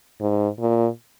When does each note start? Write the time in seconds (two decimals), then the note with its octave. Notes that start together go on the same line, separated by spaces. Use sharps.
0.21 G#2
0.60 A#2